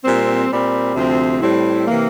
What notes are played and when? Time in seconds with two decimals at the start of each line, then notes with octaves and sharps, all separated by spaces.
0.03 A#2 G3 C4
0.49 A#2 G3 C4
0.94 D2 C3 F3 C4
1.40 A2 G3 C4 E4
1.86 C3 E3 A#3